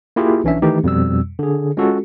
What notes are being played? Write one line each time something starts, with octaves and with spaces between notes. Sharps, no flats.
A#3 E4 F4 G4 G#4
B1 E3 C#4 D4 E5
D#3 E3 A3 D#4 G4
F2 B2 G3 E6
D3 G#4
G#3 C#4 F4 F#4 A4